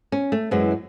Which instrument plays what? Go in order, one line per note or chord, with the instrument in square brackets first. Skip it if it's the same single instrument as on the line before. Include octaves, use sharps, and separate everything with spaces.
[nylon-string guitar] C#4
A3
F#2 E3 G#3